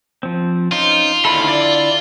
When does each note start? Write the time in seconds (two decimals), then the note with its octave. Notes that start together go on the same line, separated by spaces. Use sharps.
0.23 F3 C4
0.72 C#4 D#4 F4 C5
1.25 D#2 D3 E4 A4 B5
1.48 D5